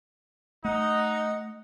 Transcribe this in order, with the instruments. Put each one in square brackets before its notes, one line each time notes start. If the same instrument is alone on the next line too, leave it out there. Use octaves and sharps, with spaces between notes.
[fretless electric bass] A3 [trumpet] D#4 [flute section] D#5 [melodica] F#5